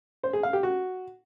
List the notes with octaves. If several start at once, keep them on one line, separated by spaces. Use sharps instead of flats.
C5
G#4
F5
G4
F#4